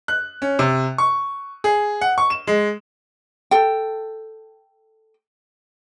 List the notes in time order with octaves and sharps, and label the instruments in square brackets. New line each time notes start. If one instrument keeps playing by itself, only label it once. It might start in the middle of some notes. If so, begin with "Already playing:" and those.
[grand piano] F#6
C#4
C3
C#6
G#4
F#5
C#6
E7
G#3
[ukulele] A4 G5